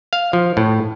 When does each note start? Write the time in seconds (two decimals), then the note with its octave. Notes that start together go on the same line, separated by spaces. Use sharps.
0.13 F5
0.33 F3
0.57 A2